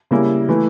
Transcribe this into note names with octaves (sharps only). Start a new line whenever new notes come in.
C#3 G3 A#3 E4
E3 A3 E4